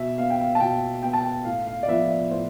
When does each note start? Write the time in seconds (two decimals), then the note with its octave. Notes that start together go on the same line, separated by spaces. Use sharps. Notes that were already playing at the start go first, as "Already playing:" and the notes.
Already playing: B2 E5
0.18 B3 F5
0.30 G5
0.41 F5
0.55 A5
0.60 B2 G5
1.03 B3 G5
1.13 A5
1.22 G5
1.45 A2 F5
1.67 F5
1.83 D5
1.88 F3 B3 E5
2.09 D5
2.30 A2 C5